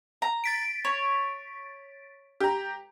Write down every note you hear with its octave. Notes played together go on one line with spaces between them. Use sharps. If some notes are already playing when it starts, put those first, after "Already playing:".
A#5
A6 B6 D7
C#5
G4 A#5